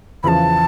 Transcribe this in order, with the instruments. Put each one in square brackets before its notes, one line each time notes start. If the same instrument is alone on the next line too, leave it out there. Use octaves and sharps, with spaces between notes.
[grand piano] E2 C#3 F3 [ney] A5 B5